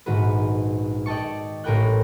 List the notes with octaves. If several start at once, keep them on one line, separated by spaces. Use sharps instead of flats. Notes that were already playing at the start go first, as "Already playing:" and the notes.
A#1 G#2 D#3 F#4 B4
D5 D#5 G5 A5 C#6
A1 A2 A#4 B4 G5 F#6